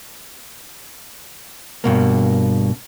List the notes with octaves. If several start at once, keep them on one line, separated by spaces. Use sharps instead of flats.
G2 B2 A#3